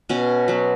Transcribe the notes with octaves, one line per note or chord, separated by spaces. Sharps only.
B2 C#4
F#3 B3